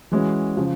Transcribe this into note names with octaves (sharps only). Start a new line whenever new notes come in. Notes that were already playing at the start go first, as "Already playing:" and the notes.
E3 G#3 C#4 F#4
C#3 F3